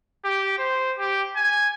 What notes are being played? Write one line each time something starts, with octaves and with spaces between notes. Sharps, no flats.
G4
C5
G4
G#5